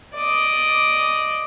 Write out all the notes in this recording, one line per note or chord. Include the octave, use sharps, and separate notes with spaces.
D5 D#5